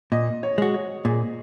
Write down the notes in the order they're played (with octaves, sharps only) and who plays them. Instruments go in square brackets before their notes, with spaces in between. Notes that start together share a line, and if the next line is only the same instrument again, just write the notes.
[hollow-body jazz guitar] A#2 [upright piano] D#5
[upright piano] C#5
[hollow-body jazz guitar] G#3 F#4
[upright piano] C#5
[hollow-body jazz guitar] A#2 [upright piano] G#4